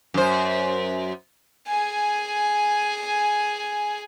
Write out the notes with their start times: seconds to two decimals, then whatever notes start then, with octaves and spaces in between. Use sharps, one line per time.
0.14 F#2 C5
1.68 G#4 G#5